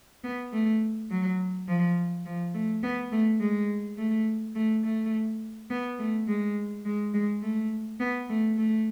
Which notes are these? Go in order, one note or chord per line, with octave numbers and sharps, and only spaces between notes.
B3
A3
F#3
F3
F3
A3
B3
A3
G#3
A3
A3
A3
B3
A3
G#3
G#3
G#3
A3
B3
A3
A3